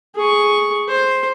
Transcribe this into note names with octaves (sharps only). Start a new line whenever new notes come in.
G#4 C#6
C5